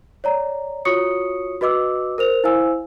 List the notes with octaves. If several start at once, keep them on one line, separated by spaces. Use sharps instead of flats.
C#5 D5 A#5
F4 F#4 C#5 C#6 D#6 C#7
F#4 B4 D#5 D6 E6
A#4 C5 F7
E4 C5 F5 G#5 E6